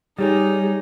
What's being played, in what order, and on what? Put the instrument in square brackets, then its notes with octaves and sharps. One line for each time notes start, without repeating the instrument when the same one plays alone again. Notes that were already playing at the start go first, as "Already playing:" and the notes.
[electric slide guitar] G3 [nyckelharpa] D#4 [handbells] G4 C#5 G#5 [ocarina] G#4